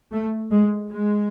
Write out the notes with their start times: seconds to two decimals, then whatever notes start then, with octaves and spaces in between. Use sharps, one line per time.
0.12 A3
0.51 G#3
0.90 G#3